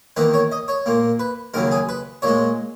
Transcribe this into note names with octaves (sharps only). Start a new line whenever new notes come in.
E2 D#3 A#3 B4
C#5
D#5
C#5
A#2 A#3
B4
D#2 C#3 F#3 A#4
G#4
B4
A#2 G#3 C#5